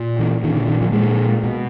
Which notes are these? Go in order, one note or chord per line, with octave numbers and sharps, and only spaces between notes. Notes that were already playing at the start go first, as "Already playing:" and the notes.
Already playing: A#2
E3
A#2 D#3
D3
D#3
F3
A#2 G#3
B2